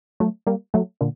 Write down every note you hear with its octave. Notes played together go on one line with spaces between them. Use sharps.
F#3 A3
G3 A#3
F#3 A3
A#2 D3